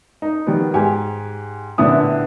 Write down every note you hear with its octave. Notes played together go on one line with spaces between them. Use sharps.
D#4
D#3 G3 B3
G#2 G4 G#5
A#1 A2 D3 B3 E4 D#6